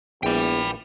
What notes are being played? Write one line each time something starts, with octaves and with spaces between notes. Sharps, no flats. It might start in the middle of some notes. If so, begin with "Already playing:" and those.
A#1 E2 E3 G5 B5